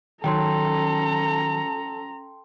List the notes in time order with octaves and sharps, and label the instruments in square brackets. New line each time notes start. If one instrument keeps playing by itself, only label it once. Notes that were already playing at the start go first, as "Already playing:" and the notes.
[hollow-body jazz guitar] D#3 F#3 [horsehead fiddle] C#4 A#5 [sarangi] A4 [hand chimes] G5 C6